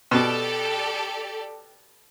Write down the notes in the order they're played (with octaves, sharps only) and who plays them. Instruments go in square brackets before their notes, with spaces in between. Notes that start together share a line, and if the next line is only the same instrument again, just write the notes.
[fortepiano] B2 [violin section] G4 A4 D5